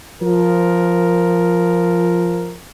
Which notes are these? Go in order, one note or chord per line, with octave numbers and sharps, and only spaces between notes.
F3 A#4